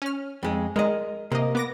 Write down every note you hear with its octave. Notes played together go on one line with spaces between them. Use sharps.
C#4 F6
F2 G#3
G#3 A#4 D#5
C3 A#3 D#5
B3 D6 A#6